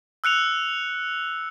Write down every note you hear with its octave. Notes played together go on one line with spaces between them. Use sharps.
E6 F#6 C#7 F7